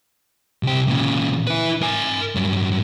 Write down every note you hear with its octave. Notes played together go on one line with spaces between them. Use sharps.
C2 G4
A#2 C#3
E4 B4
A#4 G#5
G2 F#3